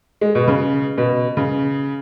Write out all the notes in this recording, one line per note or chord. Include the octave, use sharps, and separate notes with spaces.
G#3
B2
C#3
B2
C#3